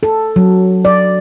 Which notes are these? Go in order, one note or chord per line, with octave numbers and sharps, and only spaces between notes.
A4
F#3
D5